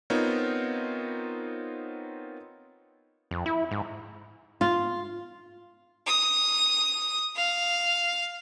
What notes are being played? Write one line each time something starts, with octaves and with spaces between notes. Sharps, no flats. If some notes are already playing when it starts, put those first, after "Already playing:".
B3 C4 D#4 F4 A#4 C#5
F2
E4
G#2
F4
D#6
F5